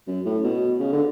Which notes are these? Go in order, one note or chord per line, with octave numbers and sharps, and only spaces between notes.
F#2
A2
B2
C#3
D3